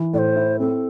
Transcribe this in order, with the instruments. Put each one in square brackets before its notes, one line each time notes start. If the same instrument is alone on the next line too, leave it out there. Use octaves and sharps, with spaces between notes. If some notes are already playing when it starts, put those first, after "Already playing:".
Already playing: [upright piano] E3
[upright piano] A2 [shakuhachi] D5
[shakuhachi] C5
[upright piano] E4
[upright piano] C4 [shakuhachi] A4